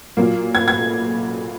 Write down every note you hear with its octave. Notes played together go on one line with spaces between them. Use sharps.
A#2 F#3 A#3
G#6
G#6